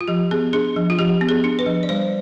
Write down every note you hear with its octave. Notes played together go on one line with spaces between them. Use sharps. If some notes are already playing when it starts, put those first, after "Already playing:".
F4
F3 G4
B3 G#4
D4 G#4
F3
F4
F3 G4
B3
G#4
D4
B4
F3
D5
G3 C5